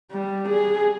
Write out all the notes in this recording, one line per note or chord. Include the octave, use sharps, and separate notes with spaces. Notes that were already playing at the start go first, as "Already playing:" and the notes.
G3
G#4